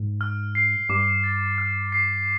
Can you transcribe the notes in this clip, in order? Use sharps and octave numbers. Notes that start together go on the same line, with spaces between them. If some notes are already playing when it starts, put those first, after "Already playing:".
Already playing: G#2
F6
C7
G2 D6
A6
F6
C7